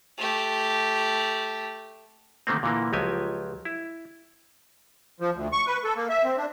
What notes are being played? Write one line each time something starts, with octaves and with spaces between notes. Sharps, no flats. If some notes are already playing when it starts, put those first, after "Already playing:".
A3 G4
D3 D#3 A3 A#3 C4
A#2 D3 E3 A#3
C#2 F3 F#3 G4 G#5
E4
F3
D2
C#6
B4
A4
A#3
E5
C4
D4